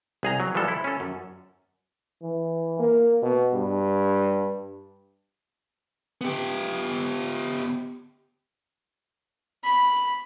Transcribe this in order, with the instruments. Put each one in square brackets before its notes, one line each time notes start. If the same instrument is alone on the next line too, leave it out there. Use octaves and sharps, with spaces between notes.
[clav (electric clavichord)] C2 G#4 A#5
F#3
E3 F3 G3 G#3 A4
E4
C#4 A4
F#2
[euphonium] E3
A#3
B2
G2
[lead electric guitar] B3 G4
[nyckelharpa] B5